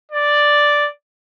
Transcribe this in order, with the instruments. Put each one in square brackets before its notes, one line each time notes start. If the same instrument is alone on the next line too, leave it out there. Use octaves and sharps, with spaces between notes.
[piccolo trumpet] D5